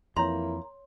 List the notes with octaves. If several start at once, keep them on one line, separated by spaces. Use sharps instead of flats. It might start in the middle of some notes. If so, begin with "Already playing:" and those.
F2 E3 A#3 E4 C#5 A#5 C6